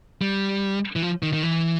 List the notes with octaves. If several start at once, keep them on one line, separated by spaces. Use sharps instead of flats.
G3
E3
F3
D#3
D#3
E3